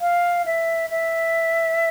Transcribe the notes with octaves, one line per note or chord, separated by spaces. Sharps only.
F5
E5
E5